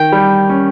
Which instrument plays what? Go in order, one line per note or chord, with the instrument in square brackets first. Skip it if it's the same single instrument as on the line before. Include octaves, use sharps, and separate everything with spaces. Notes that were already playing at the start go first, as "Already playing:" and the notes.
Already playing: [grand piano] D#3 [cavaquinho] G5
[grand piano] G3
C#4